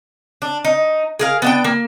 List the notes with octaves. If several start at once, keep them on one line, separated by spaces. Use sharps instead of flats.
D4
D#4
G#4 A#4 F5
B3 D4 G5
A#3